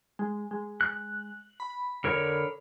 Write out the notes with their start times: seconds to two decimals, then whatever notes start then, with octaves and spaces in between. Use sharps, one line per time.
0.19 G#3
0.51 G#3
0.81 F#6
1.60 B5
2.04 D3 A#4 C#5